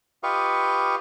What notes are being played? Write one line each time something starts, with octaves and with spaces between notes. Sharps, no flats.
F4 G4 B4 D#5 F5 C#6